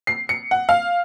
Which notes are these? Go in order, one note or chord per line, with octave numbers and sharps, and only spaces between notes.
C7
C#7
F#5
F5